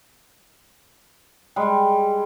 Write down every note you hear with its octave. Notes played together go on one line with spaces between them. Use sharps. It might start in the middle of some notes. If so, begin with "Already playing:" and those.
G3 G#3